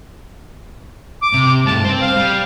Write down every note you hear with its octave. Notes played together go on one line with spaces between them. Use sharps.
D6
C3
G2 A3 A5
C4 C5
F5
G3